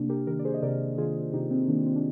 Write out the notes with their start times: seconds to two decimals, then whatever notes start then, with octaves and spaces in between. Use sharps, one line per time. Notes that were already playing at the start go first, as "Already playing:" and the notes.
Already playing: C3 A#3 D4
0.09 G4 A#4
0.27 D#3 G4 A#4
0.39 D5
0.45 G#4 C5
0.54 D#5
0.62 C3 A#4 D5
0.98 D#3 F4 G#4
1.33 C3 D#4 G4
1.51 C4
1.68 D#3 A#3 D4
1.86 C4
1.96 D4